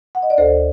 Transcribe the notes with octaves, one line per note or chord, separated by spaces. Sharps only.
F#5
D#5
D5
D2 A4 C5